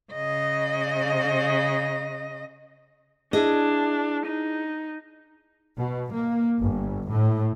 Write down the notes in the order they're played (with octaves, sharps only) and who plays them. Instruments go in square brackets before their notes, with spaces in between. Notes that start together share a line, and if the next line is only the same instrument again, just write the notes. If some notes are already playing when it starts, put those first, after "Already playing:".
[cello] C#3 D#5
[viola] D4 [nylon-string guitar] E4 G#4 D#5
[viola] D#4
[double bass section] B2
A#3
G1
A2